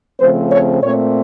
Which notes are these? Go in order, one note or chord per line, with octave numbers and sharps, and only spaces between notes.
C#3 F3 A3 C4 C5
C#5
A#2 A3 C4 C#5